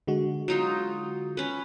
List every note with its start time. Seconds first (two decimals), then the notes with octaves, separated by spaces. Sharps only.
0.07 D3 G#3 F#4
0.48 F#3 D#4 F4
1.37 C#4 B4